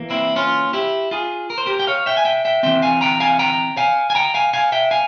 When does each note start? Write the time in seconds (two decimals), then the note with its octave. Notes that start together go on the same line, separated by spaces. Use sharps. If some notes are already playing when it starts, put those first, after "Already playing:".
Already playing: E3 A#3
0.10 C4 E4
0.36 C#4 F4
0.73 E4 G4
1.11 F4 G#4
1.50 A#4
1.58 C5
1.66 G4 A#4
1.79 G5
1.87 C#5 F5
2.06 E5 G5
2.17 G#5
2.25 E5 G5
2.45 E5 G5
2.63 E3 G#3 C4 E5 G5
2.82 F5 G#5
3.01 G5 A#5
3.20 F5 G#5
3.39 G5 A#5
3.77 F5 G#5
4.10 G#5
4.15 G5 A#5
4.34 F5 G#5
4.54 F5 G#5
4.72 E5 G5
4.91 F5 G#5